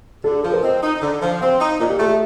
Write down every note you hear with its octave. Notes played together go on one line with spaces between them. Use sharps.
D3 A4
F3 A4
A#4
C4 D#5
D#4
D3
F3
C4 F5
D#4
A#2 D#5
G4
A3 A4
G4